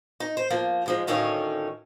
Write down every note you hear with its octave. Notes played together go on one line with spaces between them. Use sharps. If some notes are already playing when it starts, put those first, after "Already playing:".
D#4
C5
F3 A#3
G#2 F3 G#3
D2 A2 D#3 C#4 C#5 F5